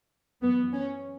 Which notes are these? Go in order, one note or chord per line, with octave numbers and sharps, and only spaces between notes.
F#2 E3 B3
C#4